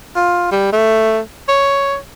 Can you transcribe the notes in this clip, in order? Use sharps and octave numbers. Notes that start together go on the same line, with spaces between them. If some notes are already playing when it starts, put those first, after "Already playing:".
F4
G3
A3
C#5